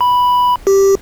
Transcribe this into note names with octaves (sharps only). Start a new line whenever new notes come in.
B5
G4